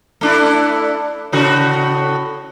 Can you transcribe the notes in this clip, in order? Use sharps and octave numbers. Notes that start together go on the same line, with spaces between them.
A3 D4 E4
A2 C#3 F#4